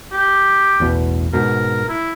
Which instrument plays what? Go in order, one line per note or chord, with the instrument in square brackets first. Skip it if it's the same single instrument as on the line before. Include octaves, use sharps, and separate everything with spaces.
[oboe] G4
[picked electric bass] A1 E2 B2
[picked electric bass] G#2 B2 [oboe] A#4
[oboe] E4